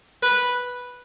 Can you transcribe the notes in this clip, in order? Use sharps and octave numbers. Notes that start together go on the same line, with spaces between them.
B4